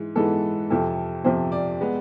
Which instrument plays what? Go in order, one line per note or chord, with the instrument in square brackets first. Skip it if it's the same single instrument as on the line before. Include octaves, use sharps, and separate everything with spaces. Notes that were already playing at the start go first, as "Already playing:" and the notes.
Already playing: [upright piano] G#2 E3 G#3
G#2 E3 G#3 B3 A4
F2 C3 F3 A4
F2 C3 F3 C5
D5
G#3 B3